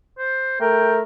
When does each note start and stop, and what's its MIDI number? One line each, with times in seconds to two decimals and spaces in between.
0.19 0.57 72
0.61 1.04 57
0.61 1.01 70
0.61 0.93 79